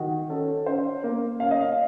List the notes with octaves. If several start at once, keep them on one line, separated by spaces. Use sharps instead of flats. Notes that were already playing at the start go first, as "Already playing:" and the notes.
Already playing: D#3 F#4
C#4 A4
C#4 C5
A#3
C#4 F5
D#5
F5